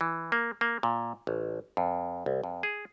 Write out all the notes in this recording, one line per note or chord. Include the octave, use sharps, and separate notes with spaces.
E3
A#3
A#3
A#2
A1
F2
C2
F2
G#4